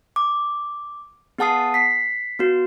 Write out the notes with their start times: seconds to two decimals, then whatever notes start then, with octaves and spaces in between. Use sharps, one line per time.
0.16 D6
1.38 B3 G#4 F#5 A5 D#6 C7
1.74 B6 C7
2.39 B3 F#4